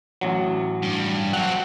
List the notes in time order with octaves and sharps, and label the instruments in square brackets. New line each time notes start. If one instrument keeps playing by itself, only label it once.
[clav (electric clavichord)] A1 F#3
[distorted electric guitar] G2
[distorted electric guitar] F#3 C4 [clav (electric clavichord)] F#5